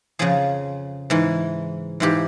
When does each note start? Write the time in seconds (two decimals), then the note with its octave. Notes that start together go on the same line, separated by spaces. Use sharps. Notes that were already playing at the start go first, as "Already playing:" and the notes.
0.19 F2 C#3 F3 G#4
1.10 G#2 E3
2.00 G#2 E3 G4